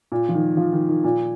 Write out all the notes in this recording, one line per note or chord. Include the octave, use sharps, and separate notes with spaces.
A#2
F3
D#3
F3
D#3
D#3
A#2